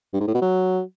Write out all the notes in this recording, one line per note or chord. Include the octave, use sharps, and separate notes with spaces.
G2
G#2
A2
B2
F#3